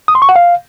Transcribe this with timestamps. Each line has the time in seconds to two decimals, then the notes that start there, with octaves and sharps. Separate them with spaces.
0.08 D#6
0.15 C6
0.22 C#6
0.29 F#5
0.36 F5